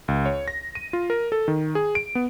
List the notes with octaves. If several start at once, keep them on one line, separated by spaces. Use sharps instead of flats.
C#2
C#5
A#6
D#7
F4
A#4
A4
D#3
G#4
D7
B3